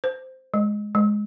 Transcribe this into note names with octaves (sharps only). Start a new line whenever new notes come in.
C5
G#3
G#3